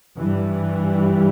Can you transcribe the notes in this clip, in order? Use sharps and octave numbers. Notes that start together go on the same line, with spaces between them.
G2 E3 G3